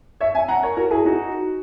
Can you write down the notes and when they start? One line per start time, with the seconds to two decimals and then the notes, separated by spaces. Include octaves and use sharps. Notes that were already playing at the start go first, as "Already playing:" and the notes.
0.20 C#5 E5
0.34 E5 G#5
0.48 F#5 A#5
0.63 A#4 C#5
0.77 F#4 A#4
0.90 E4 G#4
1.05 D#4 F#4